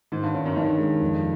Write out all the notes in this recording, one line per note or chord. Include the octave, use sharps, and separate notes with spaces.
G#2 D#3
G2
G2 C#4
F#2
G2 D#3
G#3
F2